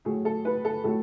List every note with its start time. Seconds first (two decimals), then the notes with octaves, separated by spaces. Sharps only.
0.05 A2 F#3 A3 G#4
0.25 A4
0.45 B4
0.65 A4
0.84 A2 F#3 A3 A4